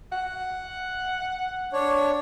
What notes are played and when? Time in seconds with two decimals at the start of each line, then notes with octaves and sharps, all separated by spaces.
0.12 F#5
1.73 D4 C#5